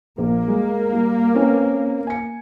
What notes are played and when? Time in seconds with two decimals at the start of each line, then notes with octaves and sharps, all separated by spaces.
0.18 A#1 A#3
0.48 G#3
0.93 G3
1.34 C4 C#4 B4
2.07 G#5 C#7